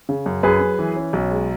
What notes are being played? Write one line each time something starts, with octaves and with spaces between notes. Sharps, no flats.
C#3
F#2
F#2 G#4 B4
F#2
E3
C#4
B1
G#3